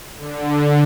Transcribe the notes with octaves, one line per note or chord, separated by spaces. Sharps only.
D3